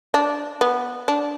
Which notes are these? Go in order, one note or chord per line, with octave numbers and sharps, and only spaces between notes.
D4
B3
D4